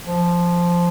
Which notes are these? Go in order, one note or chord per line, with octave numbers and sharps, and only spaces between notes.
F3